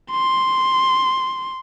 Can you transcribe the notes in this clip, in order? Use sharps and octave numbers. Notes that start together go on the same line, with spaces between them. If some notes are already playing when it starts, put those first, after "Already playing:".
C6